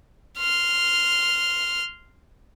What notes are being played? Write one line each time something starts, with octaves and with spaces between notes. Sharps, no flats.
C6 F6